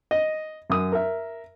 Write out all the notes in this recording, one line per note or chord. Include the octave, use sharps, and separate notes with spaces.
D#5
F#2 D#6
A#4 E5